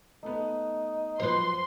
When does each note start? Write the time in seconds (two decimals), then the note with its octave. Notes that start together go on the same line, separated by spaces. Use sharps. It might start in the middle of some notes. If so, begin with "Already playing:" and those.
0.23 A3 B3 D#4
1.20 F#2 F3 B4 C5 C6